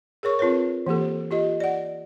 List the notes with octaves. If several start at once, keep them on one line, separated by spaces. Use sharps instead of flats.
G#4 A#4 C#5 C#6
C4 F4 A#4 B4 C#5
E3 A#3 G4 A4
F4 G4 D#5
D5 F#5